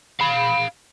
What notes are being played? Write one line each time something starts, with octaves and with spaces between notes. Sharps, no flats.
F5 B5